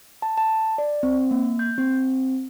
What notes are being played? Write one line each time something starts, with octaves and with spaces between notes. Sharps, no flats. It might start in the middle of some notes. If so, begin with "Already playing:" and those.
A5
A5
D5
C4
A#3
G6
C4